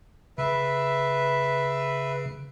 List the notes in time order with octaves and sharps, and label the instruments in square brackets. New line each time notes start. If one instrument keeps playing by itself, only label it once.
[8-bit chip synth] C#3 [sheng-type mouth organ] B4 E5